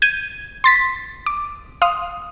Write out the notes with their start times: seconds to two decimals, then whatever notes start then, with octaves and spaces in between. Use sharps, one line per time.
0.02 G6 G#6 D#7
0.64 C6 A6 B6
1.26 D6
1.82 F5 C6 D#6